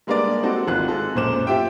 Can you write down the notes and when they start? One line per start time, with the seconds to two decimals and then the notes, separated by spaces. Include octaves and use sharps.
0.07 G3 G#3 A#3 B3 D4 D5
0.43 C4 D#4 F#4 A4
0.68 G#1 F4 F#6
0.88 G#3 A4
1.15 B1 F#2 A#2 C5 D6 E7
1.47 F4 G4 E5 G5